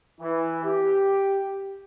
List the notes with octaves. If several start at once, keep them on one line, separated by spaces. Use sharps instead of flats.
E3
G4